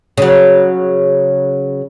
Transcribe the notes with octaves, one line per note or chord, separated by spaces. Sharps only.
C#3 F#3